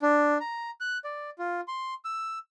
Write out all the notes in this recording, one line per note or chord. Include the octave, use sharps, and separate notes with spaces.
D4
A#5
F#6
D5
F4
C6
E6